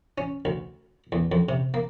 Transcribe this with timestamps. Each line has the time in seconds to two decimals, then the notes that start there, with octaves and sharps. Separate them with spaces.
0.18 C#4
0.45 D2
1.12 E2
1.32 F2
1.49 C3
1.74 A#3